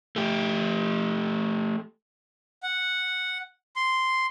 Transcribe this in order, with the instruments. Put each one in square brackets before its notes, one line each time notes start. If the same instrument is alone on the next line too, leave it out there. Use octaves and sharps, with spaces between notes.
[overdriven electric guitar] A3 G4
[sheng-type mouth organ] F#5
C6